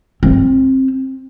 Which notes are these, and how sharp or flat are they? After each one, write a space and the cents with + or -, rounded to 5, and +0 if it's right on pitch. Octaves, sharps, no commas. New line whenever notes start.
C4 +20